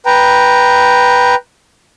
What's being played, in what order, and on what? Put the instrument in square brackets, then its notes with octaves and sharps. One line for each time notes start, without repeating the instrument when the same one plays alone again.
[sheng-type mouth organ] B4 G5 A#5